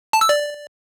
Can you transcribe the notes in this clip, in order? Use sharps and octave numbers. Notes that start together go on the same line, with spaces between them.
A5
E6
D5